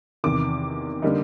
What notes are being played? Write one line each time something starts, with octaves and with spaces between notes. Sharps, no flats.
E2 C3 D#3 D6
D3 G3 A#3 D#4